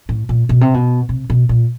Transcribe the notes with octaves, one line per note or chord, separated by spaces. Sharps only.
A2
A#2
B2
C3
B2
C3
B2
A#2